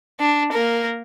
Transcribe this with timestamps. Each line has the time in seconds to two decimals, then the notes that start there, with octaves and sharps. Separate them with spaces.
0.20 D4
0.52 A#3 A#4